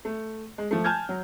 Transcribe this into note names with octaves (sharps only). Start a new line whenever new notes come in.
A3
G#3
F3 A3
G#5 A5 F6 G6 G#6
F#3